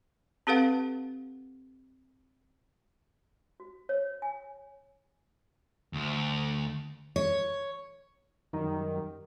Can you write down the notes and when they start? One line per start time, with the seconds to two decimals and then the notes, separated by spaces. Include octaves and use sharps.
0.47 C4 G4 A4 B4 F5 F#5
3.60 F#4
3.89 C#5
4.22 G#5
5.93 D2
7.16 C#5
8.53 F#2 D#3 G3